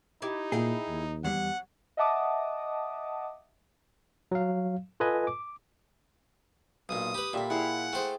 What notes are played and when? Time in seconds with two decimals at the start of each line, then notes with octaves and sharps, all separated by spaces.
0.22 D#4 E4 G4
0.52 A#2 E4 G#4 F5 G5
0.88 D#2
1.24 E2 F#3 G3 F#5
1.97 D#5 E5 F#5 A5 D6 D#6
4.31 F#3 F5
5.00 F4 A4 B4 D#5 G#5
5.27 D6
6.89 B1 A#2 D#6
7.14 G4 B4 B5
7.33 A#2 G3 G4 A4 E5 B5
7.50 E4 G#4 F5 F#5
7.93 A3 G#4 C5 G5